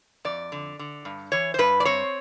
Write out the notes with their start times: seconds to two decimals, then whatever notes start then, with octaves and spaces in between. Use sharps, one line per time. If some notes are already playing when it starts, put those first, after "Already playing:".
0.25 F2 D5
0.52 D3
0.79 D3
1.05 G2
1.32 E3 C#5
1.54 C5
1.59 G2 B4
1.80 D5
1.85 C4 C#5